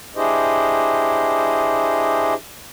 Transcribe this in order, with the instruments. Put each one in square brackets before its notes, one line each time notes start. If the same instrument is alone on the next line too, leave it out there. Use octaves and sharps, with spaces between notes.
[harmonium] D4 E4 G4 G#4 C5 D#5